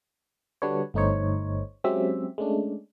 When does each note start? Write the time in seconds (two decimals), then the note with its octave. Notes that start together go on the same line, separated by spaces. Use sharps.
0.62 D3 G3 D4 F#4 B4 C#5
0.94 G1 A3 D#4 C5 C#5
1.84 F#3 G#3 C4 C#4 G4 E5
2.38 G#3 A3 C#4 D4